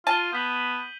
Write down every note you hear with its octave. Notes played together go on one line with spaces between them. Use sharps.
F4 A5 D#7 G7
B3 G6 B6 F#7